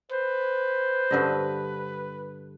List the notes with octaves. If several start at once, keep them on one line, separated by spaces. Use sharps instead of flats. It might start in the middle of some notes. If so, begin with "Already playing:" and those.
B4 C5
G2 D3 D#5